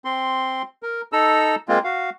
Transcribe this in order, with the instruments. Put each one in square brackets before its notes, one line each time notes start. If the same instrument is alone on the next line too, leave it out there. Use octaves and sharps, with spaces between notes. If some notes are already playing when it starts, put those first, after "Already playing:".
[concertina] C4 C6
A#4
D#4 A4 A#5 E6
G#3 A#3 C4 F4
F#4 F5